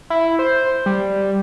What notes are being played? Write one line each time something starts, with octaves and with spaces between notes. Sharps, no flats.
E4
C5
G3